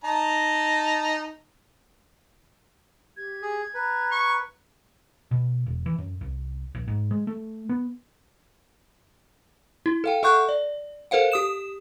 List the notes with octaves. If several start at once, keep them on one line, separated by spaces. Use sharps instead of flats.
D#4 A5 A#5
G4 G#6
G#4
B4 A#5
C#6
B2
E1
E3
F#2
C2
A#1
G#2
G#3
A3
B3
E4
A4 F5 G5
A4 E5 F#5 C#6 F#6 G6
D5
A4 A#4 C5 F5 F#5
G4 D#6 E7